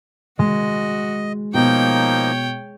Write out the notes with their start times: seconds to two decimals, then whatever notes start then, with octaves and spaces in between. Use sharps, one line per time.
0.39 G#3 F#4 D#5
1.54 B2 F3 A#3 D#4 C#5 G5